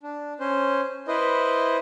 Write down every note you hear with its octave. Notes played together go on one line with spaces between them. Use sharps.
D4
C#4 C5
E4 B4 C5 D#5